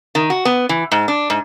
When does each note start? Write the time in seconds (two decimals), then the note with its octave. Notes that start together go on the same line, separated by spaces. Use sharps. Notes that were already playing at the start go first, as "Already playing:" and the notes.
0.15 D#3
0.30 F#4
0.45 B3
0.69 E3
0.92 G#2
1.08 D4
1.30 G#2